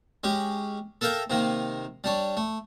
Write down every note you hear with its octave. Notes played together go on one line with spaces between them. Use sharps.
G#3 C#4 G4
A4 A#4 E5 F5 G5
C3 D#3 A#3
G3 D4 C#5
A3